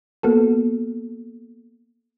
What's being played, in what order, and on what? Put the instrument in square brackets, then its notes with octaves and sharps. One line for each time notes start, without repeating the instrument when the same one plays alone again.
[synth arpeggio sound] A#3 B3 F#4 A4